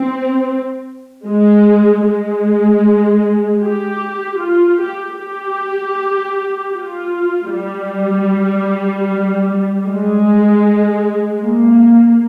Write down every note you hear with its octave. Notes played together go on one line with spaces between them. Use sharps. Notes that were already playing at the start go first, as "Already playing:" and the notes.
Already playing: C4
G#3
G#3
G4
F4
G4
G4
F4
G3
G#3
A#3